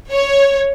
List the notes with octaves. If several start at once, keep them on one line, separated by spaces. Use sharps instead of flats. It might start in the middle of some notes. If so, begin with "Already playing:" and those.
C#5